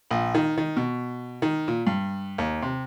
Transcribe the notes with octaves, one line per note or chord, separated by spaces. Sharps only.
A#1
D#3
D#3
B2
D#3
A#2
G2
D#2
C3